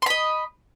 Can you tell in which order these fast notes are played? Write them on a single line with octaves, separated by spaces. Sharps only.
C6 B5 D#5